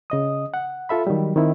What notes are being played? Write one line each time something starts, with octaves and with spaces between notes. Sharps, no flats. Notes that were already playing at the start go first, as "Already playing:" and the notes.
C#3 D#5 D#6
F#5
F4 A4 E5 B5
D#3 F#3 G3
D#3 C4 E4